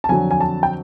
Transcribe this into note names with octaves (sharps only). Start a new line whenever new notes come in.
A5
F2 D3 F#3 G#5
G#5
A5
G5